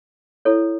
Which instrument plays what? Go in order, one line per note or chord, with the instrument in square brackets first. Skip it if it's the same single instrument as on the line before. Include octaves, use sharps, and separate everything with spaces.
[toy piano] E4 A4 C#5